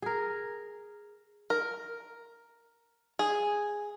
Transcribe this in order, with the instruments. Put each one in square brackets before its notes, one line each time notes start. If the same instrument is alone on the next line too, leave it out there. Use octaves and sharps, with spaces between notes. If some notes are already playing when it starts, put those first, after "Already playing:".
[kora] G#4 A#4
[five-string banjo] A#4
G#4